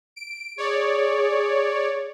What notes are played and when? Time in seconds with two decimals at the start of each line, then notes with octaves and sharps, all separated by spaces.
0.16 D7
0.58 G#4 C#5 D5